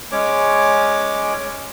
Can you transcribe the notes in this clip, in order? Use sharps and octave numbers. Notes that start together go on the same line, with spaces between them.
G#3 C#4 C#5 D6